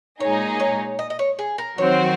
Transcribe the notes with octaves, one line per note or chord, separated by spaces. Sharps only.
A#2 G#3 D#4 G#4 C#5
C#5
D#5
D#5
C#5
G#4
A#4
D#3 F#3 C4 F#4 C5 C#5